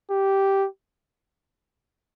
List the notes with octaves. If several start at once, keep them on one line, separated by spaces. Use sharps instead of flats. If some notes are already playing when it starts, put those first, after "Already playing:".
G4